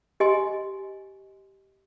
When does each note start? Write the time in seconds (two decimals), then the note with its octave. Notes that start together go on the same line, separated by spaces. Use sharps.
0.20 G4 D#5 G#5 C6